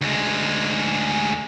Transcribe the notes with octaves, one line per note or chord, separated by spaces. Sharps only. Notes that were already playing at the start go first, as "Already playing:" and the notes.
D2 G#3